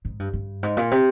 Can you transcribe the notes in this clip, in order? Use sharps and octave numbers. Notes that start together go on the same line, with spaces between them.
G#2
G2
G2
G#2
A#2
C3